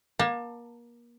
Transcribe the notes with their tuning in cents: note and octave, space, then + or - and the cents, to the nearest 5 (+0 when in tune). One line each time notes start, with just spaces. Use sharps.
A#3 +30 A5 +20